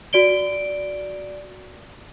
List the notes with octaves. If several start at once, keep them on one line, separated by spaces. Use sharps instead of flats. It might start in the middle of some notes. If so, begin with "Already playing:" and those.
F#4 D5 D7 G7